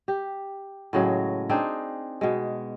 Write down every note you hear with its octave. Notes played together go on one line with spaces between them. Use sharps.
G4
A2 C#3 F#3 G#3
C4 D4 D#4 G#4
B2 G#3